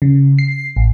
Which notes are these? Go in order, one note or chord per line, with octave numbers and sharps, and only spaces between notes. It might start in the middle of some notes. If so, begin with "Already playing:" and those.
C#3
C7
A1